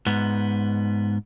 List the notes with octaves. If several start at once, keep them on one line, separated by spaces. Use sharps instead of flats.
G#2 B3